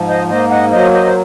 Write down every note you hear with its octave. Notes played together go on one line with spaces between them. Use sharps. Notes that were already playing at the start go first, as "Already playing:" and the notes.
Already playing: G#2 F3
C5 D#5
A#3 C5 D#5
D#5 F#5
F#3 C5 D#5
C5 D#5
C5